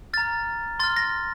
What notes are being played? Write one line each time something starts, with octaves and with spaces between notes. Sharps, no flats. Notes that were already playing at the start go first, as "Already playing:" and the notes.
A#5 F6 A6
C6 F6 A6
A#6